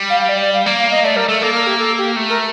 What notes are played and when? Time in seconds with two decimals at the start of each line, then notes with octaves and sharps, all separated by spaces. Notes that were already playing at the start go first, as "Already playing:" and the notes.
Already playing: G3
0.10 F5
0.20 F5
0.29 D5
0.41 D5
0.54 F5
0.66 A#3
0.79 F5
0.91 D#5
1.04 A3 D5
1.16 G3 A#4
1.28 A3 A4
1.42 A#3 A4
1.54 A#4
1.67 G4
1.79 A4
1.98 G4
2.16 A3
2.30 A#4